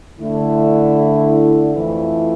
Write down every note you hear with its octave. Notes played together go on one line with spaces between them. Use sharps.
D3 A3 E4
F2 E3 A3 E4